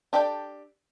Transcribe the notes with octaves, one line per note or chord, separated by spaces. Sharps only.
D4 G4 A4 D5 G5